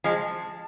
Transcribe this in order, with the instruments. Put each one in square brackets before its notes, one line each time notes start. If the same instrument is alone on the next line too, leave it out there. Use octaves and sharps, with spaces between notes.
[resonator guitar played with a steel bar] F3 G#3 [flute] A5